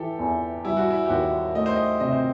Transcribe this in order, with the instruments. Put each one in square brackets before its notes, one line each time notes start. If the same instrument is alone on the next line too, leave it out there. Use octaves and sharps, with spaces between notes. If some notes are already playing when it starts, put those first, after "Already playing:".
Already playing: [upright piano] E3 [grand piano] G4 A4
[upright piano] E2
[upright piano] G3 [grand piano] E4
[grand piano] F#4
E4
G4
[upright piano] D#2 [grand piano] F#4
[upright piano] A3 [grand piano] D#5
[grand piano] C5
D#5
[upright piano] C3 [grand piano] D#5
[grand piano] C5